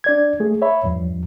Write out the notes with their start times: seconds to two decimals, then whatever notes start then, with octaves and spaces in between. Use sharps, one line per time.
0.04 D4 D5 G#6
0.40 A3 G#4
0.62 C#5 E5 B5
0.83 E2 G2 F3